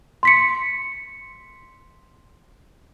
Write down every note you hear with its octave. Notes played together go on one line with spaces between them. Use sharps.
C6 B6 C#7